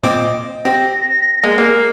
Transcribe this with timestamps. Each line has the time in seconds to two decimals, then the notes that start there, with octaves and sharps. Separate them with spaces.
0.03 A#2 C4 D#5 D6
0.65 C4 G4 A#6
1.44 G#3 A#3
1.58 G#3 A#3